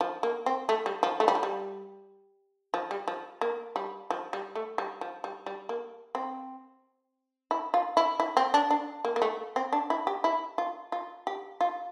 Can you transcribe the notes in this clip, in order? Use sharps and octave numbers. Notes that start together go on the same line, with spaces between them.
F3
A#3
C4
A3
G3
F3
A3
G3
F3
G3
F3
G3
F3
A#3
G3
F3
G3
A3
G3
F3
G3
G3
A#3
C4
E4
F4
E4
E4
C4
D4
D4
A#3
A#3
A3
C4
D4
E4
G4
E4
F4
F4
G4
F4